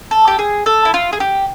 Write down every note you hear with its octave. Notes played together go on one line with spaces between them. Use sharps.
A4
G4
G#4
A4
E4
F4
G#4
G4